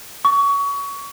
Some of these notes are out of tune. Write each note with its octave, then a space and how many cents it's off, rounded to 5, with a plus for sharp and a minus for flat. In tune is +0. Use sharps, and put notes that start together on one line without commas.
C#6 +25